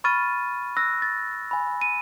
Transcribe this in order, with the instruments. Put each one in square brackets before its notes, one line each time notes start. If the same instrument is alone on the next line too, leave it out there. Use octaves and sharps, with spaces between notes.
[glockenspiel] B5 C#6 F6 A6 D#7
E6 F#6 A#6
A6
G#5 B5
D#7